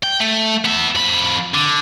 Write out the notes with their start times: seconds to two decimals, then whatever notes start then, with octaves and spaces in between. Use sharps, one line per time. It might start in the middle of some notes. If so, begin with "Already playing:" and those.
0.03 G5
0.20 A3
0.65 B3 E5
0.95 F2 B5
1.54 D3